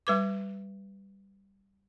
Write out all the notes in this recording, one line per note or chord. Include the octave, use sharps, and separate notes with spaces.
G3 B4 D6